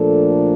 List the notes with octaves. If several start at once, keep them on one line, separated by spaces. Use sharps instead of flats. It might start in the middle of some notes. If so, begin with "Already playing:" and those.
Already playing: A#2 F3 A3 D4 A4